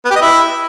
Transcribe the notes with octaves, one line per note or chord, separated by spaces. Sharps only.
B3
G4
D#5
E4